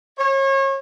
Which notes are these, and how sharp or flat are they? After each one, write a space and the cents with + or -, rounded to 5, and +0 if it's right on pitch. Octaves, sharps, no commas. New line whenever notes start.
C#5 -35